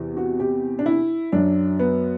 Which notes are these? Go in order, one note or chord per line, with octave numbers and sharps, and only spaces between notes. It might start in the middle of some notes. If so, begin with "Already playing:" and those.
Already playing: E2 C3 E3
F#4
G4
D4
E4
F#2 F#3 D4
B3